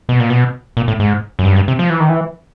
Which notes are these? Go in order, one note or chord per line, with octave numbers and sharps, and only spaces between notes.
B2
A#2
B2
A#2
A2
G#2
F#2
G2
F#2
G2
C3
F3
E3
D#3
E3